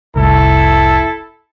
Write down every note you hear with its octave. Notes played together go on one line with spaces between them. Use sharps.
F1 C2 E4 A4